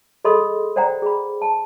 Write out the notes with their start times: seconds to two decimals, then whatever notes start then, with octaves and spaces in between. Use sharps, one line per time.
0.25 G#4 A4 D#5 B5 C6 D#6
0.76 C5 D5 F#5 G5 A#5
1.02 G#4 B5
1.42 A5